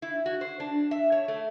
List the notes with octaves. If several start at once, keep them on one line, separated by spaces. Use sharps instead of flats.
E4
F#4
C5
D4
E5
C#5
A3